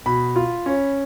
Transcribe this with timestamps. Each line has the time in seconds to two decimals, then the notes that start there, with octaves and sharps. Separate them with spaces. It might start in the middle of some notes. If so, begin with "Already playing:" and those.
0.06 B2 B5
0.36 F4
0.66 C#4